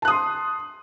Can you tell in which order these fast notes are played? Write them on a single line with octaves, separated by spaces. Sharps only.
A5 F#6 D#6 C6